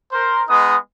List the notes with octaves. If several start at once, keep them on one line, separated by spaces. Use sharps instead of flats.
A#4 C5
G#3 B3 D#4 D#6